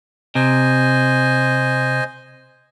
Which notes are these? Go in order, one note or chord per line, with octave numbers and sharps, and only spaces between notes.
C3 C5 D#5 G#5